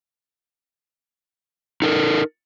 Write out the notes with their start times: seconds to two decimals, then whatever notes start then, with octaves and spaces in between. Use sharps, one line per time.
1.82 D#4 A4 A#4